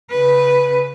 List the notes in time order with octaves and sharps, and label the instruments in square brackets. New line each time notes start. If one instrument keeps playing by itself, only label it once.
[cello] C#3 B4